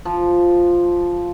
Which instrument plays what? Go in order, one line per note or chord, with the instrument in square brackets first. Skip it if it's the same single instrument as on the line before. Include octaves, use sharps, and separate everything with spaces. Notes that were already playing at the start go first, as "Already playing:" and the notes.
[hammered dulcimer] F3